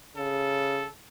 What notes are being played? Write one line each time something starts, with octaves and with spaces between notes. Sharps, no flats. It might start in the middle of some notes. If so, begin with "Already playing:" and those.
C#3 A4